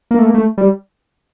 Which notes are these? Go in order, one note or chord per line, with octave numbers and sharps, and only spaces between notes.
A#3
A3
A#3
A3
G3